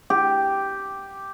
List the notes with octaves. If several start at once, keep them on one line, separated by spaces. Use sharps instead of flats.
G4